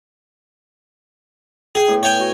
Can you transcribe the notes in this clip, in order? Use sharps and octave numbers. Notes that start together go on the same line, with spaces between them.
G#4 G5
A2 B3
C#5 G5 G#5
F#4